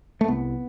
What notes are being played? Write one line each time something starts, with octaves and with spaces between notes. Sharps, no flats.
A3
C2 B3